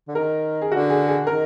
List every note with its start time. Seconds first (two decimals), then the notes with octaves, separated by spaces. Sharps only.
0.08 D3
0.15 D#3 A#4
0.61 G#4
0.70 D3 F#4
0.90 G#4
1.08 G#4
1.27 D#3 A#4